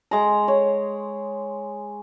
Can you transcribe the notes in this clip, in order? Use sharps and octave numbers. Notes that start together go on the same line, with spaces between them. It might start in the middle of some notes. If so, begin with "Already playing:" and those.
G#3 A#5
C#5